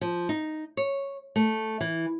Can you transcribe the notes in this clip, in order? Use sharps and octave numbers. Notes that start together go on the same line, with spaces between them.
F3
D#4
C#5
A3
E3